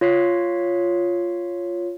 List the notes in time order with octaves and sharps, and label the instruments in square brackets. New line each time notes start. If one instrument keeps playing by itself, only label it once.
[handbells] F4 C#5 B6 C7